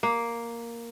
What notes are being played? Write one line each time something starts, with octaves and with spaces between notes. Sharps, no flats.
A#3